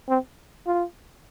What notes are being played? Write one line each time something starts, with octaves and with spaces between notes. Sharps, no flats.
C4
F4